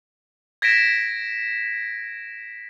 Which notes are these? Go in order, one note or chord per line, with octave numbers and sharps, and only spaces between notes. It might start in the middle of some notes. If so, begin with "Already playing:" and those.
G#6 A#6 B6 D7 E7